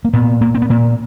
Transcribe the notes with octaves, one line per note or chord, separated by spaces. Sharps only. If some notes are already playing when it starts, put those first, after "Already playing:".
A#3
A#2 B3
A#2 A#3
C4
B3
A#2 A#3